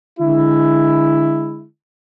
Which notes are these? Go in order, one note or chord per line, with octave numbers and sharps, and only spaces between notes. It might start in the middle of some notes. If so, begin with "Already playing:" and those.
D3 G#3 E4